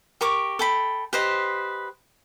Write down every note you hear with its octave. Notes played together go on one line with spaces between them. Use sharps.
G4 A#4 C#6 D6
A4 G5 B5
G4 B4 C5 D#5